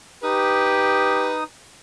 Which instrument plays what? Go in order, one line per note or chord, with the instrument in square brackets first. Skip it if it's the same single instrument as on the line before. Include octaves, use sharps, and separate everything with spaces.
[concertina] D#4 D#6 [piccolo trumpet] G4 [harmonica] B4